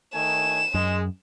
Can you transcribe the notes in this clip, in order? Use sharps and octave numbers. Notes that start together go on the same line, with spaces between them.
D#3 A3 G#5 E7
F#2 G#3